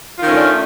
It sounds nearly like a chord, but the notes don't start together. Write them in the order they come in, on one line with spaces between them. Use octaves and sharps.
F4 D#3 C#4 A3 D4